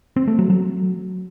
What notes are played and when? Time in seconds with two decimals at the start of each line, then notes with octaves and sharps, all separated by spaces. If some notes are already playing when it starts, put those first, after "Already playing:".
0.16 C4
0.28 A3
0.39 F#3
0.50 F#3